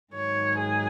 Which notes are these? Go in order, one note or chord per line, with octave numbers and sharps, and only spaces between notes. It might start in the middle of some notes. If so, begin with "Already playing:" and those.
G#2 D#3 F#3 C#5
G#4